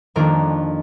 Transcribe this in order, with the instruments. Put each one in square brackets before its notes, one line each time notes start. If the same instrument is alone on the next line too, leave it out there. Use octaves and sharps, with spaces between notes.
[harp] F2 D#3 A#3 D4 A#4